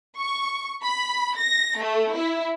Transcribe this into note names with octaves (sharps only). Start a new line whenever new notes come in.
C#6
B5
A#6
A3
E4